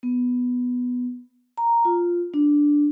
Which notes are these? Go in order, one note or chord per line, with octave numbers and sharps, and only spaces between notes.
B3
A#5
F4
D4